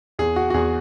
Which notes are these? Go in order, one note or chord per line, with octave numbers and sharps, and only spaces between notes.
E2 G#4
F#4
F#4
E2 G#4